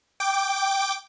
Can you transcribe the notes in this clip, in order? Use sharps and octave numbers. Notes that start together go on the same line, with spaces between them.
G5 D6